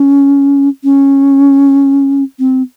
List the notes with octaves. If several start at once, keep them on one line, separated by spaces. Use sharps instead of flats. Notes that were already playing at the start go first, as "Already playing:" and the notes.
Already playing: C#4
C#4
C4